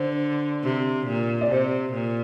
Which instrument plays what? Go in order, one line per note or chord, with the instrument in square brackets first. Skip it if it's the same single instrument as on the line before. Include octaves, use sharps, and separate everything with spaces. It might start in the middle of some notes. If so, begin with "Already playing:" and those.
Already playing: [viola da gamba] D3 [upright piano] C5
[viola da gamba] C3
A#2
[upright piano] D5
[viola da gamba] C3 [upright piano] C5
[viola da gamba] A#2